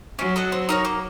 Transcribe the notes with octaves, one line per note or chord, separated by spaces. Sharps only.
F#3 C#4
A4 D#5 F#5
C4
D#4 A#4 C#5
A#3